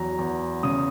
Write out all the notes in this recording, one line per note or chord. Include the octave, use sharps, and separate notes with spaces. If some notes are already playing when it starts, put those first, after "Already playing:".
Already playing: E2 F#3 A#5
E2
C#3 D#6